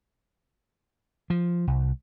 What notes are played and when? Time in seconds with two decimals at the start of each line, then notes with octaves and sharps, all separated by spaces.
1.30 F3
1.67 C2